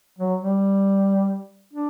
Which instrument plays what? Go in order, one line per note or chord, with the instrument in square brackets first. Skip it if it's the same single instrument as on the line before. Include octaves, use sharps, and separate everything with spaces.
[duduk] F#3
G3
D4